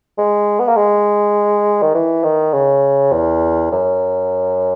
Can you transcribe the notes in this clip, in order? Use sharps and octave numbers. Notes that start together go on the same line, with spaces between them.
G#3
B3
A#3
G#3
D#3
E3
D#3
C#3
E2
F#2